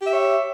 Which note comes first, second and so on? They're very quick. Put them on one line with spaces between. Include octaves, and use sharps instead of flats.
G4 E5 C#5